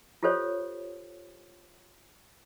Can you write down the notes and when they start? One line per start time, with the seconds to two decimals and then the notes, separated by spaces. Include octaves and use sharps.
0.23 F4 G4 A4 C5 C#5